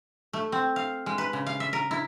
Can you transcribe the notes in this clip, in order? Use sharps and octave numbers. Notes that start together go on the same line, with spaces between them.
A3
C4
F5
G#3
B4
C#3
F5
E5
A#4
E4